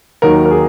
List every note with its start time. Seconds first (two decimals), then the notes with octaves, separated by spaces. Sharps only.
0.22 D#2 D#3 F#3 A#4
0.45 A#4
0.51 G#4